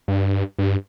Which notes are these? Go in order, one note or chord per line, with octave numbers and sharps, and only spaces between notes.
G2
G2